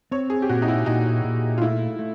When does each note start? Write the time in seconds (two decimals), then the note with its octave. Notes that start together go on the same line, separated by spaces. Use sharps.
0.12 C4 C#5
0.30 G#4
0.42 G4
0.49 A#2 F#4
0.62 D#4
0.68 E4
0.86 A#2 D#4
1.24 A#2
1.58 F4
1.61 A3 E4
1.99 A3